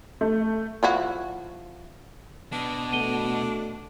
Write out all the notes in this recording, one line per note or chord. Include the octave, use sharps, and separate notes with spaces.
A3
F3 E4 F#4
B2 D4
A3 F#4 D#7 G7